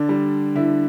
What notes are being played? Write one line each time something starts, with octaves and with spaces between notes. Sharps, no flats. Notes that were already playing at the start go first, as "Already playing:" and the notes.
Already playing: D3 D4
G3
D3 E4